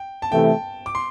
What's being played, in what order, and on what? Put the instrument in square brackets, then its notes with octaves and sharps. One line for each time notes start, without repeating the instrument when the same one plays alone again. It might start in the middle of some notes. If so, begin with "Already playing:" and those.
Already playing: [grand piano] G5
A5
[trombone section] C3 E3 A3 [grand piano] G5
[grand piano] D6
C6